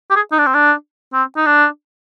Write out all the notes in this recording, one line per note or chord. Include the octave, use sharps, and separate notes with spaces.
G4
G#4
D#4
D4
C4
D4
C4
D#4
D4